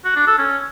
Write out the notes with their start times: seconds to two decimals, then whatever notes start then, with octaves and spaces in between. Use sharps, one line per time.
0.04 F#4
0.16 D4
0.27 A4
0.38 C#4